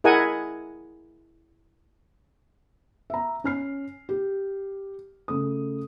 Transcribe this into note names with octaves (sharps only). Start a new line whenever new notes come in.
E4 G#4 A#4 D#5 F#5 G#5
E5 A#5
C#4 F6 C7
G4
C#3 A3 D#6